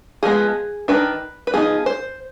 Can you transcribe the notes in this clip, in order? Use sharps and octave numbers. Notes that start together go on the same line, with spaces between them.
F3 G#3 B3 G#4
D#3 G#3 D4 B4
B4
F3 B3 D#4 G#4
C5